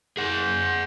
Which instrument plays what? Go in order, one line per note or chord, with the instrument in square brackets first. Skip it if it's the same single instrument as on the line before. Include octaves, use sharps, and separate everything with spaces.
[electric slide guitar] G#4 F#5